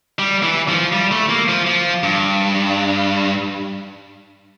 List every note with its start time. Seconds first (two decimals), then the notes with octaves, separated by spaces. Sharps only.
0.19 G3
0.43 E3
0.68 F3
0.93 G3
1.11 A3
1.29 A#3
1.49 F3
1.66 F3
2.03 G2